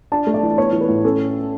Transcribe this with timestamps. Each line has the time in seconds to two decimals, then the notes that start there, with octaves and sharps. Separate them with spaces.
0.12 D4 A5
0.27 A3
0.34 D5
0.43 E3
0.58 B3 C#5
0.73 E3
0.81 B4
0.88 A2
1.04 C#4 A4